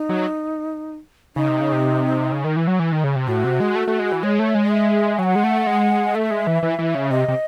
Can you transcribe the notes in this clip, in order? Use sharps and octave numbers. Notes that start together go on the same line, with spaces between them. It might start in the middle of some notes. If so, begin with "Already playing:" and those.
Already playing: D#4
F#3
C#3 D#4
C3
C#3
C3
C#3
D#3
E3
F#3
E3
D#3
C#3
C3
A2 F#4
C3
G#3
A3
A3
G#3
E3
G#3 C#5
A3
G#3
E5
F#3 F#5 G#5
G#3
A3
G#3
A3 E5
G#3
E3
E3
E3
C#3
C3 D#5
C3